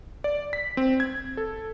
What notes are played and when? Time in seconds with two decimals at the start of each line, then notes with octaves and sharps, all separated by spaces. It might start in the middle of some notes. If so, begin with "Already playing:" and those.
0.24 D5
0.53 B6
0.77 C4
1.00 G#6
1.37 A4